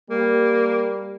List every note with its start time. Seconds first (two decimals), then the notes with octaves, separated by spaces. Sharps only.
0.10 G3 A#3